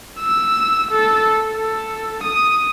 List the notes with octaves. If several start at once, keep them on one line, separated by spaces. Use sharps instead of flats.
E6
A4
A4
D#6